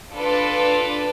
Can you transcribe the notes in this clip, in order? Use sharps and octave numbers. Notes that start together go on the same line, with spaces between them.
D4 F4 A4 B4 D5